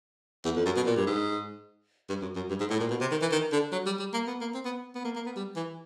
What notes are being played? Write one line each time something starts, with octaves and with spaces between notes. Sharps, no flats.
E2
F2
F#2
B2
A#2
G2
G#2
G2
F#2
F#2
G2
G#2
A2
A#2
B2
C3
D#3
E3
D#3
D3
F#3
G3
G3
A#3
B3
A#3
C4
B3
B3
A#3
A#3
B3
G3
E3